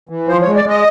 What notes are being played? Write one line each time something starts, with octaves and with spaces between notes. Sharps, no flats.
E3
F3 C5
C#5
G#3
D5
G#3
D#5